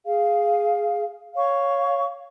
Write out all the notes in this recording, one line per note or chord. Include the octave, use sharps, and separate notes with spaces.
G#4 F5
C#5 F5 C#6